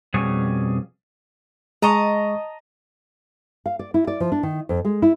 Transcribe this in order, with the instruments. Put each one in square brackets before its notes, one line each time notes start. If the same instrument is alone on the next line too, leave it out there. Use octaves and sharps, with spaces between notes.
[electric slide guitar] F2 B2 G3 C#4 G#4
[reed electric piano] G#3 C#6 [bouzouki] D#5 A5 A#5
[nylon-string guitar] F5
D5
E4
D5
F3
D4
D#3
F2
G#3
E4